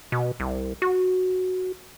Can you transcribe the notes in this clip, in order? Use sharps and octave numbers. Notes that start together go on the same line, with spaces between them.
B2
C2
F#4